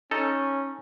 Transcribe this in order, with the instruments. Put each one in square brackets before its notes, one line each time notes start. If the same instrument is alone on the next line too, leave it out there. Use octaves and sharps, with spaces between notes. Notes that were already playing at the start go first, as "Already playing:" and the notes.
[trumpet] C#4 [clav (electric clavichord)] D#4 A4